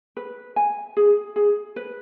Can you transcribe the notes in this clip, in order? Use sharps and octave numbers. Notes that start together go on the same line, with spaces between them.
B4
G#5
G#4
G#4
B4